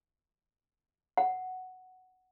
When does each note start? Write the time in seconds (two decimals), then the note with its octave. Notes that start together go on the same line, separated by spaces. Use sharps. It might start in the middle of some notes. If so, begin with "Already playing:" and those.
1.17 F#5